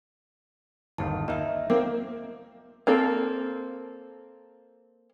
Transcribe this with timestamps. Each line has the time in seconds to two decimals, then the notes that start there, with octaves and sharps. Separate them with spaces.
0.98 G1 D#2 D#3 A5
1.28 A#3 D#4 D#5 E5
1.70 A#3 C4 D6
2.87 A#3 C4 A4